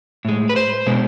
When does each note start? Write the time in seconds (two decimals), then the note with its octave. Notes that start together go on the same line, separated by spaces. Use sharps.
0.25 A2 G#3
0.49 B4
0.56 C5
0.87 B2 G#3